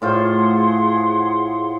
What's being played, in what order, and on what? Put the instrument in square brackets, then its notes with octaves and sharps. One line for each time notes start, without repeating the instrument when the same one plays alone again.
[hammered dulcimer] A2 F4 C5 [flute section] G#4 F#5 C6